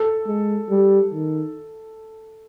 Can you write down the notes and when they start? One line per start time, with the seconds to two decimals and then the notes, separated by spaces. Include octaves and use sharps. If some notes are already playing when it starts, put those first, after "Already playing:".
Already playing: A4
0.26 G#3
0.70 G3
1.13 D#3